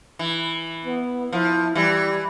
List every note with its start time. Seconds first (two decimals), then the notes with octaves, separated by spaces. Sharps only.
0.19 E3
0.85 B3
1.33 F3 E4
1.75 E3 G3